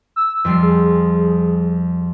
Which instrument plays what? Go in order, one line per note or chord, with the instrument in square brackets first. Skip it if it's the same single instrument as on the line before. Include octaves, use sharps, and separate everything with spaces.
[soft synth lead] E6
[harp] F2 G3 C7
[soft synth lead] G#4